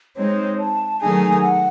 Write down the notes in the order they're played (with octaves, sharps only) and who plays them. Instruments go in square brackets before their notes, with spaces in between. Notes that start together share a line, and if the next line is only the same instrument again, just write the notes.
[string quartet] G#3 C4 D#4 [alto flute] C#5
[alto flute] A5
[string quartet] D#3 F#3 A3 D#4 G#4 [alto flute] G#5
[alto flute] G#5
F#5